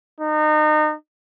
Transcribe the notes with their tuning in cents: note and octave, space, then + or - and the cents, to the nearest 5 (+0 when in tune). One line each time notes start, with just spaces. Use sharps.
D#4 -30